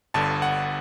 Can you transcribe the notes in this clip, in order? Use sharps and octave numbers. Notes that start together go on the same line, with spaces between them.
G1 G2 D3 A5
F#5